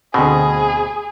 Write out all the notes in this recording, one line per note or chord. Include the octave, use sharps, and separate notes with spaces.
D2 B2 C4 G#4